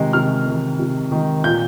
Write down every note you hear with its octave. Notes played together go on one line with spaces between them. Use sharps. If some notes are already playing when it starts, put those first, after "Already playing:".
Already playing: C3 D#3 G#3
C3 F6
D#3 G#3
C3
D#3 G#3
A#2 G6